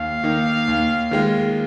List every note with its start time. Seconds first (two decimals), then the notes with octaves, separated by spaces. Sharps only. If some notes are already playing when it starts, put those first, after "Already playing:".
Already playing: D#2 F5
0.23 D#3 A#3 D#4
0.68 D#2
1.11 D#3 G#3 F4